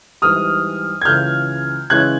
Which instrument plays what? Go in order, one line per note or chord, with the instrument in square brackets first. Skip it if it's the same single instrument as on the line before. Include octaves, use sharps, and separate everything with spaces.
[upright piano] G#2 E3 G3 D#6 F6
G#6
C#2 C#3 E3 F6 G6
C#3 E3 G#3 C#4 E4 F#6 G#6